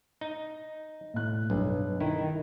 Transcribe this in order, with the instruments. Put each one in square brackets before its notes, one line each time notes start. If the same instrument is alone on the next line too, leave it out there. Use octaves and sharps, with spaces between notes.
[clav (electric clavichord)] D#4
[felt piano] A2 F#6
[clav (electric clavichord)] B1 [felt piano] G2
[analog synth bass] D#3 [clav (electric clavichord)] E4